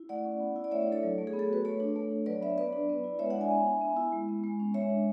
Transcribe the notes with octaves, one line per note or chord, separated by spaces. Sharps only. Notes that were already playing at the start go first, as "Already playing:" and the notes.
Already playing: E4
A3 D5 F#5
C#4
B3
E4
D5
A3 C#5 E5
C#5 E5
D4
A4 C#5
F#3
A3
G#4
B3
A4
F#4 B4
A3 A4 C#5
D4
A3
D4
F#3 B4 D5
B3 C#5 E5
B3 B4 D5
D4
B3
E4
G#3 C#5 E5
D5 F#5
D4
E5 G#5
B3
D4
B3
E4
G#3
B3
G#3
C#4
G#3 C#5 E5
D4